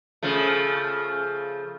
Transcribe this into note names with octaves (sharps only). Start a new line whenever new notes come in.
C#3 F3 A3